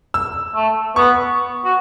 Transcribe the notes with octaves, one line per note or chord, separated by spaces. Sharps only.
E6
A3
B3 C#6
F#4